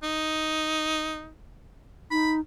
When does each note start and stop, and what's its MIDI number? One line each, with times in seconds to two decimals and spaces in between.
0.03 1.31 63
2.11 2.40 63
2.11 2.33 83